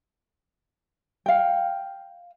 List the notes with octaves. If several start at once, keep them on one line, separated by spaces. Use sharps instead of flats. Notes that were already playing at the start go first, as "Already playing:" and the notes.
F5 G5